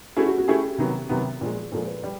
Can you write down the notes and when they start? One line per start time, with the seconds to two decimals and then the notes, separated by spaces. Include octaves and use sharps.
0.17 A3 C#4 E4 F#4 G#4
0.27 F#4
0.38 F#4
0.48 A3 C#4 E4 G4 G#4
0.78 C3 D#3 F#3 B3
1.09 C3 D#3 F#3 B3
1.41 A#2 F3 G#3
1.72 A#2 F3 G#3 A4
1.87 B4
2.04 G3